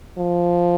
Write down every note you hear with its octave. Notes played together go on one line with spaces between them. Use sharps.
F3